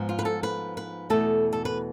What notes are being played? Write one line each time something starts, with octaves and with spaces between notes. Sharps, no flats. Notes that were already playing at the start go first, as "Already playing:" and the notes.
Already playing: G#2 F3 B3
F4
B4
A4
B4
B4
E2 B2 A3 A4
A4
B4